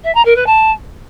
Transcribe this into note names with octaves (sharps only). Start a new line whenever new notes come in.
E5
A#5
A#4
B4
A5